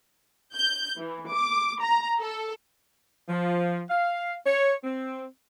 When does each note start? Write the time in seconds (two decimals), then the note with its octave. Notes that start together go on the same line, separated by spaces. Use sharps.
0.55 G6
0.98 E3
1.31 D6
1.82 A#5
2.20 A4
3.29 F3
3.90 F5
4.46 C#5
4.84 C4